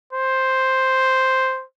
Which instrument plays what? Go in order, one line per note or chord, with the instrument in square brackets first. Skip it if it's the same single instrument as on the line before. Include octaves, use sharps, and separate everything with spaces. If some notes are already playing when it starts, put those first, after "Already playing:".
[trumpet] C5